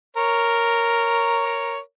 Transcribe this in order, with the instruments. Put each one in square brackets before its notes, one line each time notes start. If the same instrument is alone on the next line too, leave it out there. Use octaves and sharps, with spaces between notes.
[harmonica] A#4 C#5